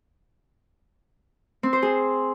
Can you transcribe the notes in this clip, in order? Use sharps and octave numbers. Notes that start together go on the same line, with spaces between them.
C4
C5
G#4